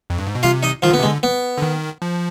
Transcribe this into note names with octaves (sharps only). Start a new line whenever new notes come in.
F2
G2
G#2
B2
C3 F4 F5
D#4 D#5
D#3 F3 F4
D3
B3
C3
G#3
D3
B3
D3
D#3
F3